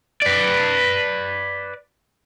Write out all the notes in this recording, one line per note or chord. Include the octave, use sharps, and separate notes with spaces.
B4 D5